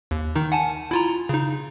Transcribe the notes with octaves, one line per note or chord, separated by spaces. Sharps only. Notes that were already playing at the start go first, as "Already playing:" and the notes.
D#2
D#3 D#4
F#5 G#5 A5
E4 F4 A#5
C#3 D#4